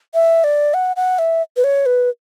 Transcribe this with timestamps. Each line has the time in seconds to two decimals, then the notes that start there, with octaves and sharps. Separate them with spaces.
0.14 E5
0.44 D5
0.74 F#5
0.96 F#5
1.19 E5
1.57 B4
1.64 C#5
1.86 B4